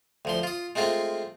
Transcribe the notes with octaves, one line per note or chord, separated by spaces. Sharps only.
D2 F3 C6
F4 D#6
G#3 A3 C4 F4